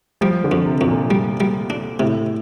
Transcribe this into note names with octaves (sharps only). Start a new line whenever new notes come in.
F3 G3
D3
F2
C3
F2
A#2
G3
G3
D4
A2 C3